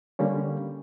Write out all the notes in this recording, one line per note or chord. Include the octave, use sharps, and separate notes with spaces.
D3 G3 A#3 C#4